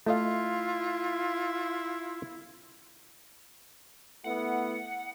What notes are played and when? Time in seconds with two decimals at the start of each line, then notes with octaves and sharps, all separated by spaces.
0.06 A3 E4 F4 D#5 F5
4.24 A3 B3 E4 F#5